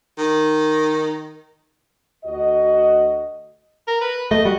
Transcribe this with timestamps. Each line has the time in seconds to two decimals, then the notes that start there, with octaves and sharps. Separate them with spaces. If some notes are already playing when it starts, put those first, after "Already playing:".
0.18 D#3
2.25 D2 F#4 D#5
3.87 A#4
4.01 B4
4.31 A3 D#5
4.45 G3 F#4